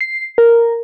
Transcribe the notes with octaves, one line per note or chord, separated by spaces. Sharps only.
C7
A#4